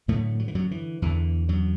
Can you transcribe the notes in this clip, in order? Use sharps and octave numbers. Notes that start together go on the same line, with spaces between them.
F#2 A2 D3 A3
F#3
E3
F#2 F#3
E3
E2 D3 E3
F#2 F#3